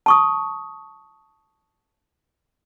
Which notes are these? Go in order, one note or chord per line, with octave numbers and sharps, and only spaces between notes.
A5 C#6 D#6